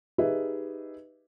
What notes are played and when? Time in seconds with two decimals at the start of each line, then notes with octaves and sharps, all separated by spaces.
0.18 D#4 G4 G#4 B4 D#5 E5